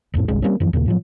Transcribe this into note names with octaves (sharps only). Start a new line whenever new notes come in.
D#1 F2 A2 C4
G1 C2 G#3 C#4
G3 A#3 C4 C#4
F#2 E3 F3
D#2 A#2 C#3 A#3
A2 F3 F#3